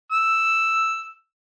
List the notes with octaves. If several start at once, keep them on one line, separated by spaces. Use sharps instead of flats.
E6